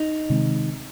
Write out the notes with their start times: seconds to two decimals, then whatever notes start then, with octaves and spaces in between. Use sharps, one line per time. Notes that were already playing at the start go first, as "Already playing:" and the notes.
Already playing: D#4
0.30 C3 D#3 G#3 C4